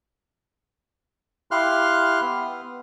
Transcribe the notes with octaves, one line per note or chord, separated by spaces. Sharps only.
E4 G4 F5 C6 F6 F#6
B3